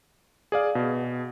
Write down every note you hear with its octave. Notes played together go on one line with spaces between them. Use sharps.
G#4 D5 F5
B2